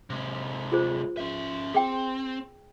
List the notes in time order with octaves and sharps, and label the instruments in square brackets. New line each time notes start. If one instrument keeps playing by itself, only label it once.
[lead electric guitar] C3 G#3
[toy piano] F4 G#4 C5
[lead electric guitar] C#4 E5
[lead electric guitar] C4 [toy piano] G#4 G5